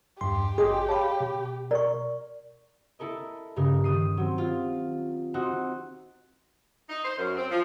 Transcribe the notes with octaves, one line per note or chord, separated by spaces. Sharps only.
E2 G2 G4 C6
G#1 G#4 D#5 C6
C#5 F5 A5 B5
B2
A#4 D5 C#6
E4 A4 A#4 D#5
G2 C#3 D#4 A#4
D#3 D#6 C7
F#3 C4
F4
C4 D#4 F#4
D#4
C5
F#2
C4
F3